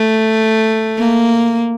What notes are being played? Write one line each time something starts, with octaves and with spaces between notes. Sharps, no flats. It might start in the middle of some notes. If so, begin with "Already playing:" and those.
Already playing: A3
A#3